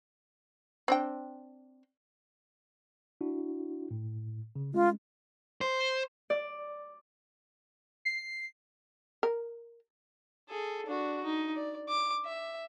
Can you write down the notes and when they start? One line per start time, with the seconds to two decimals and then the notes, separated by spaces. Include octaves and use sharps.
0.88 C4 D4 G5
3.21 D4 E4 F#4
3.91 A2
4.56 C#3
4.74 G#3 C#4 F4
5.61 C5
6.30 D5
8.05 C7
9.23 A#4
10.49 G#4 A4
10.86 D4 F#4
11.24 D#4
11.56 D5
11.89 D6
12.25 E5